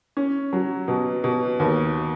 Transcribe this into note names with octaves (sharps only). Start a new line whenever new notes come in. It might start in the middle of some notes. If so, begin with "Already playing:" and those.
C#4
F#3
B2
B2
D#2